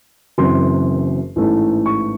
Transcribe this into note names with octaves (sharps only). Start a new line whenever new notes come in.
F#1 F#2 E3 C4 C6
A1 G#2 E3 A3
C#6